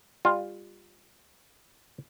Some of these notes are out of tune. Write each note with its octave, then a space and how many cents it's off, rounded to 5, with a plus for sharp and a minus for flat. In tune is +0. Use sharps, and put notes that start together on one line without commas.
G3 +25 F4 +5